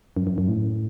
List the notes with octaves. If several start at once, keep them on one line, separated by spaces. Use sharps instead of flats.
F#2
F#2
F#2
A2